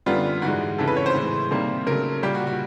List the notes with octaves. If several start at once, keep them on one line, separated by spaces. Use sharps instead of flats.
F#2 D3 G3 B3 F4
G#2 E3 G#3 F#4
F2 C#3 E3 A4
B4
C#5
C5
A2 E3 G#3
C3 D#3 G3 A#3
C#3 F#3 A3 A#4
A#2 G3 A#3 G4
F#4
F#4